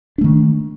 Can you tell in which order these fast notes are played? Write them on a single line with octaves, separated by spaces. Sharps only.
D4 A3 D#3